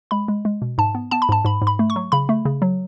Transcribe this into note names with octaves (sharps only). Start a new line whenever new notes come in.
G#3 B5
G#3
G#3
B2
G#2 A5
B3
B3 A5
B5
G#2 A5
G#2 B5
G#2
B5
A3
C#6
F#3
C#3 B5
A3
C#3
F#3